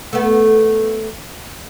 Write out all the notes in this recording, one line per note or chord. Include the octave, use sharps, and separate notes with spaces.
A3 B3